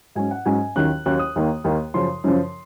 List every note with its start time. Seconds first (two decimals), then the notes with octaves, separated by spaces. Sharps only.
0.15 G#2 F#3 C#4 G#5
0.31 F#5
0.45 G#2 F#3 C#4 G#5
0.76 D#2 D#3 F#3 C#4 F#6
1.06 D#2 D#3 F#3 C#4 F#6
1.19 D#6
1.36 D#2 D#3 A#3
1.64 D#2 D#3 A#3
1.94 F#2 C#3 F3 C6
2.24 F#2 C#3 F3